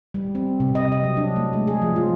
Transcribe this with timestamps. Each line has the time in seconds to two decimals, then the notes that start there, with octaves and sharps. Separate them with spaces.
0.14 G3
0.35 C4
0.60 C3
0.75 D#5
0.92 D#5
1.04 F#3
1.17 D4
1.36 A3
1.53 G#3
1.67 G#4
1.82 F3
1.96 F4